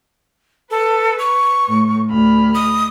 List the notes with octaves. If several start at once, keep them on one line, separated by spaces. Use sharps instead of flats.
A4 B4
C#6
A2
D2 B5 F6
D#6